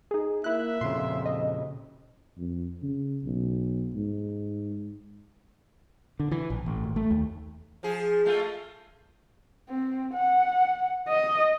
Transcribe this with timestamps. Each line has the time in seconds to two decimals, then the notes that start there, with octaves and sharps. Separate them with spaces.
0.11 D#4 G#4
0.44 A#3 E4 E5 F#6
0.81 F2 A#2 C#3 C6
1.26 D#5
2.38 F2
2.82 C#3
3.24 B1
3.94 G#2
6.20 D3
6.31 E3
6.50 A#1
6.66 A1
6.84 G#1
6.96 A3
7.11 D#2
7.83 F3 G#4
8.25 G#3 A3 F4
9.69 C4
10.14 F#5
11.08 D#5